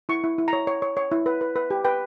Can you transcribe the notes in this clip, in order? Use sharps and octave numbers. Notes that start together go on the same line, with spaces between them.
E4 C#6
E4
E4
A#5
C#5
C#5
C#5
C#5
E4
B4
B4
B4
G4
B4 G5